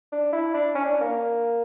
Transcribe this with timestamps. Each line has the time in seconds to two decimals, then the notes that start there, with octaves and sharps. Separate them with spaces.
0.12 D4
0.33 E4
0.54 D4
0.75 C#4
0.85 D4
1.01 A#3